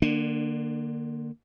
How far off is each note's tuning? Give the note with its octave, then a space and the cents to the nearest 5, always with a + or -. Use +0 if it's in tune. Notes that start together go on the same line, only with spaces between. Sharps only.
D3 +35 A#3 +0 D4 +15